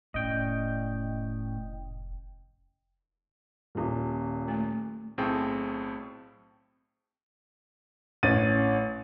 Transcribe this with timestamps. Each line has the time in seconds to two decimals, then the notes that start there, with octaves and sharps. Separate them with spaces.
0.14 F1 A2 C#4 D5 D#5 G5
3.75 D#1 A#2
4.48 A3
5.18 B1 A2 C4 G#4 G5 A5
8.23 A1 C#4 A6 D#7